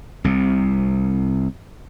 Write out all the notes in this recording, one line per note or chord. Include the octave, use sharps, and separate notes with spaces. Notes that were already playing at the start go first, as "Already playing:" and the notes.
C2 C3